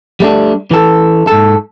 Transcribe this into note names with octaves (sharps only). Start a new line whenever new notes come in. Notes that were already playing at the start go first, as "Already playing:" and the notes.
G3 A3 D4
E3 A4
G#2 A4